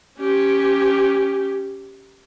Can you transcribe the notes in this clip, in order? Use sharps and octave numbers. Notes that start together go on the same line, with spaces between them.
C#4 G4